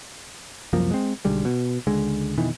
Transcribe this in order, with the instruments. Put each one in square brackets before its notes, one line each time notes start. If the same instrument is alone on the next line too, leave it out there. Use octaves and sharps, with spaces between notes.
[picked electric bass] C2 F#2 F3 A#3
G#3 C4
B1 D3 G3 G#3
B2
C#2 D3 G#3
F2 B2 D#3 E3